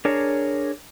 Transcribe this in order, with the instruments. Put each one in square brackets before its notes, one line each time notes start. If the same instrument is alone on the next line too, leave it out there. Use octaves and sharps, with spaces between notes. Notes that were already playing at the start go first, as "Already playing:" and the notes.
[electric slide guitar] D4 G#4 A#4 C#5